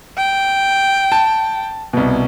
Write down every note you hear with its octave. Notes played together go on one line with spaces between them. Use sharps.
G5
A5
C2 B2